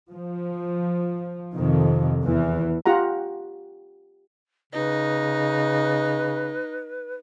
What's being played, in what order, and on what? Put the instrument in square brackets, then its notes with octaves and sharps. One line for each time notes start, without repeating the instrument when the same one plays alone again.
[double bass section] F3
F2 C3 D#3
E2 E3
[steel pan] F4 G4 F#5 A#5
[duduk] C#3 [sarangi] D#4 [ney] B4